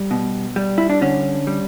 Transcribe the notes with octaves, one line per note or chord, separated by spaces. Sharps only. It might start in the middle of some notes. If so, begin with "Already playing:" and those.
Already playing: G3
B2
G3
E4
D4
D3 C#4
G3